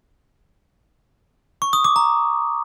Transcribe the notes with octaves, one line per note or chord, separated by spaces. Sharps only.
C#6
D#6
D6
A#5